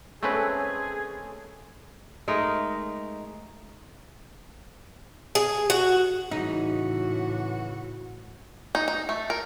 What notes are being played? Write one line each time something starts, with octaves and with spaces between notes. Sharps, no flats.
G#3 A3 C4 C#4 G#4 A4 B4
G#3 A3 D#4 A#4
G#4
F#4
A2 C#3 E3 D#4 F#4
D#4
D#4
A3
A#4